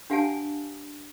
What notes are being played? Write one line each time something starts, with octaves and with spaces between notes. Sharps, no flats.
D4 G4 F5 F#5 G#5 A5